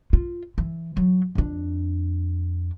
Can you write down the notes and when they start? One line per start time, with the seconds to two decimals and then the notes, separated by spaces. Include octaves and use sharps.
0.13 F4
0.58 E3
0.97 F#3
1.35 F2 D4